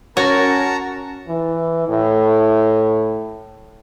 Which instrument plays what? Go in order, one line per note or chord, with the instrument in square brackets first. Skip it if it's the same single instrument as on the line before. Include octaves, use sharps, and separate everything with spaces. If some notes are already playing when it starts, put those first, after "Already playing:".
[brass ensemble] C#4 A#4 [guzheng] F#4 [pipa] C#5 [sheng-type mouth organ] A5 A#5
[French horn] E3
A2